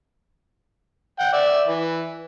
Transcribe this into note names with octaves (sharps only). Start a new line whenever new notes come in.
F#5 G5
D5 E5
E3